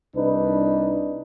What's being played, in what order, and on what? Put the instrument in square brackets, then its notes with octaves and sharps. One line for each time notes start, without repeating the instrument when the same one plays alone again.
[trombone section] C2 D4 D#4 B4